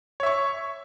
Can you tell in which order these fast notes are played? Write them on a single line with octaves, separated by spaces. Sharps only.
C#5 E5 C#6